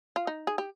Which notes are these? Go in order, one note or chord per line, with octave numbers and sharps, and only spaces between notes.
F4
D#4
G#4
G4